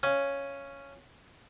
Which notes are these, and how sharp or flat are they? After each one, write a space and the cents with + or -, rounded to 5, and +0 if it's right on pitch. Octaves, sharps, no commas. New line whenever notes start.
C#4 +0 F5 -15